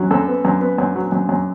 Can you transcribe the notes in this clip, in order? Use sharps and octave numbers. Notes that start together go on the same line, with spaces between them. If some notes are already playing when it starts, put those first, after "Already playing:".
Already playing: F#2 F#3
F#2 A4
B3
F#2
B3
F#2
F#3
F#2
F#2